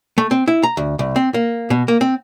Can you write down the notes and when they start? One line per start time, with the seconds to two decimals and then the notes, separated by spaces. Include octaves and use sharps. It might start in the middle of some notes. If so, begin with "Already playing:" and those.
0.18 A3
0.31 C4
0.48 E4
0.63 A#5
0.77 D2
0.99 C2
1.16 C4
1.34 A#3
1.70 B2
1.88 A#3
2.01 C4